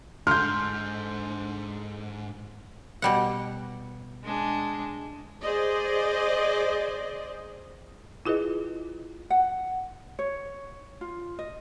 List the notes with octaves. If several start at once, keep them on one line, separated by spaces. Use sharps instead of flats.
G#2 D3 C6 F6 G6
B2 G3 F#5
G#3 D4
G#4 C5 D5 D#5
E4 F4 G#4 B4 D#5
F#5
C#5
F4
D#5